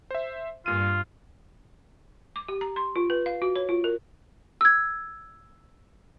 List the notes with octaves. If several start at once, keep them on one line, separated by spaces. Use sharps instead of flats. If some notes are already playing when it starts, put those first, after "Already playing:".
C5 E5
G2 A#2 F4 D#7
D6
G4
A#5
C6
F4
B4
F5
F#4
C#5
F4
A#4
E6 G#6